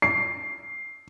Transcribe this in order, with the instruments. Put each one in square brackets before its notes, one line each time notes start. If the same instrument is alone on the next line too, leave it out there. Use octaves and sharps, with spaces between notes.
[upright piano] C7